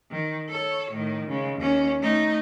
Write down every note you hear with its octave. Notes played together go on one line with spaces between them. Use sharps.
D#3
A4 C#5
A2 D#3
C#3 G#3
D#2 C#4
A3 D#4